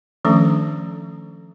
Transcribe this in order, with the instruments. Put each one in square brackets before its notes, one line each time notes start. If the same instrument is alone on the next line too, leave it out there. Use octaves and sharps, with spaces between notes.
[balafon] D#3 F3 A3 C#4 D4 A4